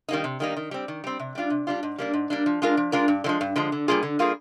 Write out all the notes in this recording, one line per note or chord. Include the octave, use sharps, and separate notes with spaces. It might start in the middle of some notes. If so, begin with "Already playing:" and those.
D#3 G3 A#3 D#4
C3
D#3 G3 A#3 D#4
D#3
G3 C4
D#3
G3 C4
C3
G3 D4 F4
C3
G3 D4 F4
G#2
G3 A#3 D4
G#2
G3 A#3 D4
F3
G#3 D4 F4 A#4
F3
G#3 D4 F4 A#4
G2
D3 F3 G#3
G2
D3 F3 G#3
D3
G3 A#3 F4 G#4
D3
G3 A#3 F4 G#4